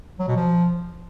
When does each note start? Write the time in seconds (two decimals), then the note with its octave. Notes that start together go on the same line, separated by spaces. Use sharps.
0.19 F#3
0.28 B2
0.36 F3